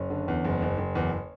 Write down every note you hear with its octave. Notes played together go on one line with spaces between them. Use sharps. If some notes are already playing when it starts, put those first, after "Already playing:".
Already playing: F#1 C#4
D3
E2
F#1
F#1
F#1
E2